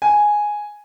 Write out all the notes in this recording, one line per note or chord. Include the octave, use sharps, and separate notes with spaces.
G#5